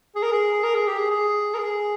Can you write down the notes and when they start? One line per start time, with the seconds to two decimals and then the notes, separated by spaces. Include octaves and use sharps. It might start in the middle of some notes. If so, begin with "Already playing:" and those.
0.15 G#4
0.23 A#4
0.32 G#4
0.63 A#4
0.75 G#4
0.87 G4
0.98 G#4
1.10 G#4
1.54 A#4
1.58 G#4